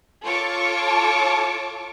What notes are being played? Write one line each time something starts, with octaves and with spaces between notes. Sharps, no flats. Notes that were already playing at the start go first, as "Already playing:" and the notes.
F4 A4 C#5 A5 C#6 D6